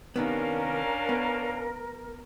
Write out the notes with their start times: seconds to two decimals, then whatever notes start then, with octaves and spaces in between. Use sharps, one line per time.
0.16 C3 D#3 B3 C#4 D4 A#4 F5
1.09 B3